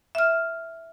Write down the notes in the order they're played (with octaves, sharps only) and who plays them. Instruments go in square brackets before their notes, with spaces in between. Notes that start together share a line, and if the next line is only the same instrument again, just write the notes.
[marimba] E5 F6